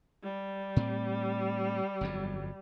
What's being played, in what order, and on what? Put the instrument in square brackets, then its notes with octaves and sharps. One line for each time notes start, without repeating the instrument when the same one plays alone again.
[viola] G3
[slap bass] A2 C4
G1 F2 F#3